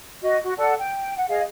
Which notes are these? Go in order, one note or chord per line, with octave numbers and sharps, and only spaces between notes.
F#4 D#5
F#4
A4 D5 F#5
G5
F#5
G#4 D#5 F5